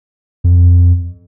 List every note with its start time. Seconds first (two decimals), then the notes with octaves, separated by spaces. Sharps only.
0.44 F2